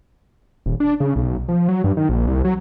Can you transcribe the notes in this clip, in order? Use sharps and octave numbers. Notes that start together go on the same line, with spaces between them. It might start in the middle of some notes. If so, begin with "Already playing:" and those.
D#1
D4
C#3
B1
F3
F#3
G2
D#3
A#1
C2
F#3